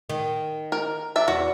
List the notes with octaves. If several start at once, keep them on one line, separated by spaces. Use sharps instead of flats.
D#3
A#4
D4 E5
E2 F#4